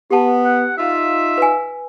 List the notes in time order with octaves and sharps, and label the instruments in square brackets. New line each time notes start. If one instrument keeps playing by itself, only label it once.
[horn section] B3 [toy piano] G4 A5
[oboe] F#5
[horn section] D#4 F4 [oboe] E5
[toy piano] B4 G#5